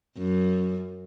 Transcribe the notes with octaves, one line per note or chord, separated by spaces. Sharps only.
F#2